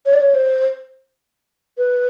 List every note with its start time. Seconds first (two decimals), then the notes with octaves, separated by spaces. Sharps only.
0.06 C#5
0.13 D5
0.20 C#5
0.35 C5
1.78 B4